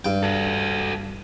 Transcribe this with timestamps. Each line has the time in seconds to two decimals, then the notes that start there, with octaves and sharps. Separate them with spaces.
0.05 G2 G5
0.23 F#4 A4